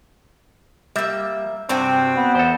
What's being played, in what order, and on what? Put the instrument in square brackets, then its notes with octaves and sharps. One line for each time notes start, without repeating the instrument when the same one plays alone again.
[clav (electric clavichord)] G3 [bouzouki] A#3 E5
[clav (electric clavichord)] G2 C3 [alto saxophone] C4 [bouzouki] F#4 G5 G#5
[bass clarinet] B3
[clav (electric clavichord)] E2 A4 [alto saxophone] C5